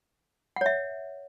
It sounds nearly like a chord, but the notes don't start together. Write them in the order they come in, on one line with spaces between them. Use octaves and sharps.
F#5 C#5 E5